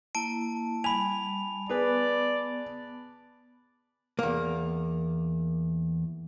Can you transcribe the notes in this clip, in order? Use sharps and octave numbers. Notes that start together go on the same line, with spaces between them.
A#3 E4 A5 D7
G3 G#5 B5 F7
B3 G#4 B4 D5
E2 A#3